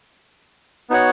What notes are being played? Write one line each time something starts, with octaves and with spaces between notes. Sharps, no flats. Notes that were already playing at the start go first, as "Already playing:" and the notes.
B3 D#4 F#4 C#5 F#5